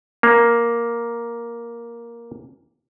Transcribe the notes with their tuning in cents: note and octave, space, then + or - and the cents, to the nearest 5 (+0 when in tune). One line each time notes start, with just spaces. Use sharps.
A#3 +5